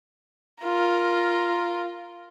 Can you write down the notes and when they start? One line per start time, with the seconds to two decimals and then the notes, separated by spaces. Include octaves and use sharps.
0.64 F4 A#4